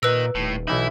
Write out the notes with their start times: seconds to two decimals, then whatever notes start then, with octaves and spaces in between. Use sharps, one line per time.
0.03 A#2 A#4 B4 D#5 E6
0.35 D#1 A2
0.67 B1 E3 D#4 E4